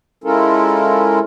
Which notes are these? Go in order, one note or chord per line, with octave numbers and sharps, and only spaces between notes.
G#3 C#4 E4 F4 A4 A#4